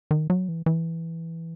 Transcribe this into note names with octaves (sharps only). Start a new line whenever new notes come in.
D#3
F#3
E3
E3